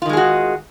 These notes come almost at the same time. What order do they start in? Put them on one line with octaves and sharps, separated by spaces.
F4 D#3 G#3 G#4 F#4